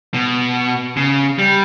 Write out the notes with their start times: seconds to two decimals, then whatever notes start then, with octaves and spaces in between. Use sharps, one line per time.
0.14 B2
0.97 C#3
1.39 G3